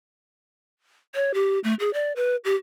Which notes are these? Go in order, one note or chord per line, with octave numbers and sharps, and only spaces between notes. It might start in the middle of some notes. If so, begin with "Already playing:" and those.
C#5
G4
A3
G#4
D5
B4
G4